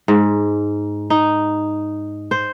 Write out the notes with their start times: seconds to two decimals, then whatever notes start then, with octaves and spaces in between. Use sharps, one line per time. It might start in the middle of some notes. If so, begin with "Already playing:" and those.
0.08 G#2
1.10 D#4
2.31 C5